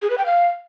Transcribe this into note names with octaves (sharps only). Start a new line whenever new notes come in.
G#4
B4
G5
F5